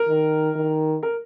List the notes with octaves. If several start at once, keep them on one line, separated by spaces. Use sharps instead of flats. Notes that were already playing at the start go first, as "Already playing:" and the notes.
Already playing: A#4
D#3
D#3
A#4